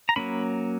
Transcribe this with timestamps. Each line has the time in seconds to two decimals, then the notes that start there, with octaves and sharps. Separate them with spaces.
0.09 A#5
0.16 F#3 A#3 C#4 B5